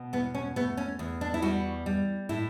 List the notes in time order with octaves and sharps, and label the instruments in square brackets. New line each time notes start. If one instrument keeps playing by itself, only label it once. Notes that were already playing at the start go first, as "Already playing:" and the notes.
Already playing: [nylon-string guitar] B2
E2 B3
C#4
A3 B3
C#4
E2
D4
E4
G3 F#4
G3
A2 E4